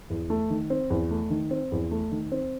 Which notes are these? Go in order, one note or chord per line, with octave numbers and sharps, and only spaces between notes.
E2
A3
D#3
C4
E2
A3
D#3
C4
E2
A3
D#3
C4